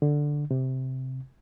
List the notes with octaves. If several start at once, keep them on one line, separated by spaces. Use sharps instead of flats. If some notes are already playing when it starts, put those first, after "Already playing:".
D3
C3